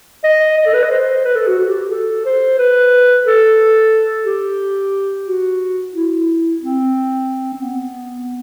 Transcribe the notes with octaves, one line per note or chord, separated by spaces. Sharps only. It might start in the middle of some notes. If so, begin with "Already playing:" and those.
D#5
D#5
A4
B4
D#5
C5
B4
A4
F#4
F#4
G4
G4
A4
C5
B4
A4
G4
F#4
E4
C4
C4
B3